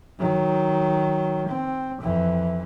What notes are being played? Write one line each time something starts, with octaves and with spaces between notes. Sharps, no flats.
D#3 F#3
C4
F2 E3